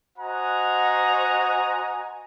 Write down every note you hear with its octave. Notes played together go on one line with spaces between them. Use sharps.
F#4 C5 D#5 F#5 G#5 A#5